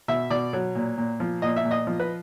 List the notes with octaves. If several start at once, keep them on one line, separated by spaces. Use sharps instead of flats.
B2 E5
B2 D5
F#3
A#2
A#2
F3
A#2 D#5
E5
A#2
D#5
F3
B4